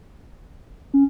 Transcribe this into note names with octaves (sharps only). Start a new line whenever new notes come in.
C#4